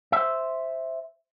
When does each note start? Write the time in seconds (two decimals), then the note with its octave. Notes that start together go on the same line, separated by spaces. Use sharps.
0.12 C5 E5